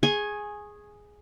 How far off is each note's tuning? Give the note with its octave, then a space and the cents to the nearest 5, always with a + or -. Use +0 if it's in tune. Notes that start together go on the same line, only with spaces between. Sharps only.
G#4 +0 G#5 +5 C#6 -25